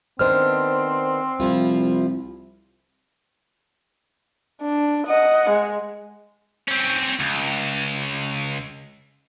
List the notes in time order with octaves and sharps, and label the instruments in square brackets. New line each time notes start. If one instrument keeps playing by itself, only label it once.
[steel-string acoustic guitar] D#3 B3 D4 [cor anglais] C4 [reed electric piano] C5 F6
[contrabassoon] C2 [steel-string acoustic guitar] F3 E4 F4
[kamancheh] D4
D#5 F#5
G#3
[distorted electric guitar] C4 C#4
C#2